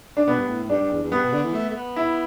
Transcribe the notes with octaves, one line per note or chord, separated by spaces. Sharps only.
D4
B2 B3
G2
A2
A2
G2 D4
G2
E2
E2
G2 B3
B2
D3
E3
A3
A3
B3
E4